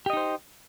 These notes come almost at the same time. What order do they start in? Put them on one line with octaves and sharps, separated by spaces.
G4 D#5 D#4 C5